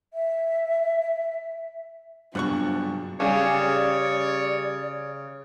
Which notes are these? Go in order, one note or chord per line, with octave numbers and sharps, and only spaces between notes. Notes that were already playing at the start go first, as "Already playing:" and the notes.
E5
F#1 G2 B2 F3 D4 F#4 C#6 F#6
C#3 G3 G#4 C#5 D5